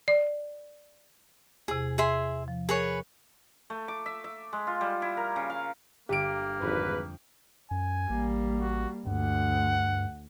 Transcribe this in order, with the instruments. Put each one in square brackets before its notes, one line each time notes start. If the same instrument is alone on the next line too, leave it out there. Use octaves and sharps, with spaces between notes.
[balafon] D5
[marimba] E2 C3 [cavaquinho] G#4
[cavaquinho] G#4 E5 C6
[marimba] F3
[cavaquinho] G#4 B4 C#5 [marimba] A#4
[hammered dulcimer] A3
D6
E5
E5
G#3
F4
G3
E4
A#4
C#3
F5
[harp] G1 D#7 [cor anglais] A#3 [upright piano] G4 D7
[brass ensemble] G#1 B4 [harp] F2
[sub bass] F#2 [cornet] G#5
[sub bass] A1 [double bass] G3 A#3
[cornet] F#4
[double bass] D2 [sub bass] G2 [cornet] F#5